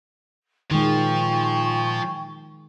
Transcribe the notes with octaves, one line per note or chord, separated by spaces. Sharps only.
A#2 D#3 F3 G#3 G5 G#5 C#6